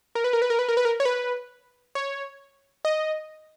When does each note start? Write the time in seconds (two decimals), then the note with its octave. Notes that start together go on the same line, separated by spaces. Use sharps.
0.15 A#4
0.24 B4
0.33 A#4
0.42 B4
0.50 A#4
0.59 B4
0.69 A#4
0.77 B4
0.85 A#4
1.00 C#5
1.05 B4
1.95 C#5
2.85 D#5